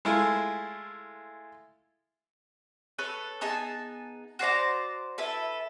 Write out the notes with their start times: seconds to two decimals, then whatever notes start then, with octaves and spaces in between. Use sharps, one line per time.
0.05 G#3 A3 E4 F4
2.98 A4 B4 C#5
3.41 B3 D#4 G#4 A5
4.39 F#4 C5 D5 A#5
5.18 E4 A4 B4